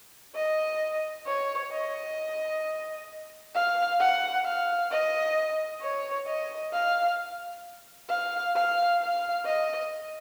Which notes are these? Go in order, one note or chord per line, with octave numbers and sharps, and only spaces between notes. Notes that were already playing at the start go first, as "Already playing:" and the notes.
D#5
C#5
D#5
F5
F#5
F5
D#5
C#5
D#5
F5
F5
F5
F5
D#5